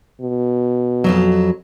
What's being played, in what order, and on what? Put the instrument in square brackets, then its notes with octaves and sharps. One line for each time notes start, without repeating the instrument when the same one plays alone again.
[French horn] B2
[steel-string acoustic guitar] F2 G#2 F#3